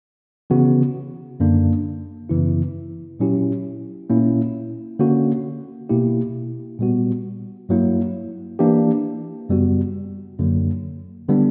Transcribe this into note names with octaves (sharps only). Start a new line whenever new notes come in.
C#3 E3 B3 F#4
F#2 D3 A#3 D4
F#2 C#3 E3 B3 E4
A#2 F#3 C#4 E4 G4
A#2 A#3 C#4 E4
D3 A#3 C#4 F#4
B2 A#3 E4 G4
A#2 G3 B3 F#4
G2 F#3 A#3 E4
E3 A#3 D4 G4
F#2 C#3 G3 B3 F#4
F#2 D3 F#3 A#3
D3 G3 B3 D4